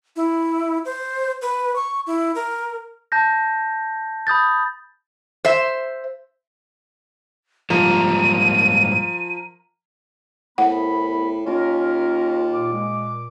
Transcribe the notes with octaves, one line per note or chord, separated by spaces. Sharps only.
E4
C5
B4
C#6
E4
A#4
A5 G6 A#6
B5 D#6 G6 A6
C5 E5
G#2 F3 G3 A#3 A#4 D#7
C2 A2 B3 F#5 B5
D#2 C#4 F4 A#4
A#2 D6
G#3